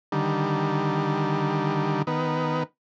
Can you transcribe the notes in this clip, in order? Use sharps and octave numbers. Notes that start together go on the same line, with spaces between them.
D3 D#3 G3
D#3 B3